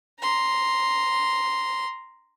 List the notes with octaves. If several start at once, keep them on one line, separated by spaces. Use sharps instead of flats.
A#5 C6